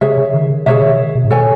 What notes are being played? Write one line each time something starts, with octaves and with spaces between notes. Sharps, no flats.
C#3 G#4 C#5 E5
C#3
D#3
C#3
B2 G#4 C#5 E5
D#3
B2
A2
B2 A4 C#5 G#5